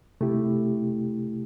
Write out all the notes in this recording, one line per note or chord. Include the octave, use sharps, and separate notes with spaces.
C3 A3 E4 G4